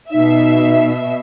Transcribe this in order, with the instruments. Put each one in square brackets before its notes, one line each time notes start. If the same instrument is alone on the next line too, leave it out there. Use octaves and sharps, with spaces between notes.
[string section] B2 E5 [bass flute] D#4